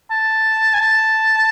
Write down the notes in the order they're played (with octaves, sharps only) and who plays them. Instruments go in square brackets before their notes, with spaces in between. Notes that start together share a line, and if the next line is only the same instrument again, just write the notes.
[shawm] A5
G#5
A5